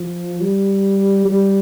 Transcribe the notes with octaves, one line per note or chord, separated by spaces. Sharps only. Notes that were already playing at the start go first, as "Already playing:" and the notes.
Already playing: F3
G3
G3